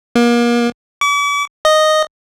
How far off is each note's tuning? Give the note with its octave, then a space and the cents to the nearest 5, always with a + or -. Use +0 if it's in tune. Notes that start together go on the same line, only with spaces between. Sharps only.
A#3 +35
D6 -45
D#5 -5